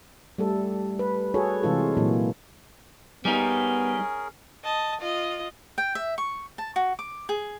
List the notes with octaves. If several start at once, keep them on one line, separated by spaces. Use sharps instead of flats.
G3 A3 A4
B4
F#4 G#4 A4 C#5
C3 E3 G#3 F4 A4
A#2 E3 F#3 A#3
G3 B3 C#4 D#4 G#4 A#4
D#5 A5
F4 D#5
G5
E5
C#6
A5
F#4
D6
G#4